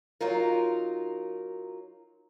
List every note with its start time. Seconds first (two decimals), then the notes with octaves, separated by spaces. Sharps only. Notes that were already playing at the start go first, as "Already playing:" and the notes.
0.21 F#3 D#4 F4 A#4